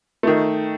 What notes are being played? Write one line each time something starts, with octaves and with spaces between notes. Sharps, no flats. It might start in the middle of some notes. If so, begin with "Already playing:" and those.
D#3 A3